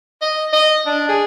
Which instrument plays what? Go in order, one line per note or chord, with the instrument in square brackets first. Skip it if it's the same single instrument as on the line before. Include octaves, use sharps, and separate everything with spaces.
[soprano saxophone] D#5
D#5
D4
G#4